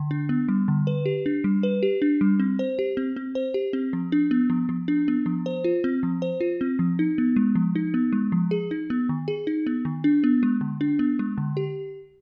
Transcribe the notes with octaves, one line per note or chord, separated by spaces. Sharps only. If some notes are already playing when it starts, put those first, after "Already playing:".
Already playing: D3
D4
B3
G3
D3
B4
G4
D4
G3
B4
G4
D4
G3
C4
C5
G4
C4
C4
C5
G4
C4
F3
D4
B3
F3
F3
D4
B3
F3
C5
F4
C4
F3
C5
F4
C4
F3
D#4
B3
G#3
F3
D#4
B3
G#3
F3
G#4
D#4
B3
D#3
G#4
D#4
B3
D#3
D4
B3
G#3
D3
D4
B3
G#3
D3
G4